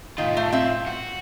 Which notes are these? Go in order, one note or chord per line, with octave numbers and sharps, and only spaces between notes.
A2 D#3 F4
A3
C4 E5
F#4